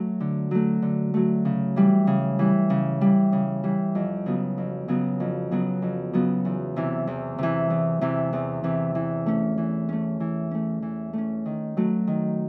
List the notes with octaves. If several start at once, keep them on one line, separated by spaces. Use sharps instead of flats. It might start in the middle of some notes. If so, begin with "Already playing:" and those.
Already playing: F#3 A3
D3
F#3 A3
D3
F#3 A3
C#3
E3 G3
C#3
E3 G3
C#3
E3 G3
C#3
E3 G3
F2
C#3 F#3 B3
F2
C#3 F#3 B3
F2
C#3 F#3 B3
F2
C#3 F#3 B3
E2
C3 E3
E2
C3 E3
E2
C3 E3
E2
C3 E3
E3
A3 C#4
E3
A3 C#4
E3
A3 C#4
E3
A3 C#4
D#3
F#3 A3
D#3